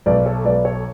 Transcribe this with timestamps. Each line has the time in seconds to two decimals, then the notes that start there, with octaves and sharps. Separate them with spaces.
0.06 B1 B4 D5
0.26 A4 C#5
0.45 B1 B4 D5
0.65 A4 C#5